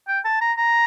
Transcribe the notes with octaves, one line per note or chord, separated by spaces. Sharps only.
G5
A5
A#5
A#5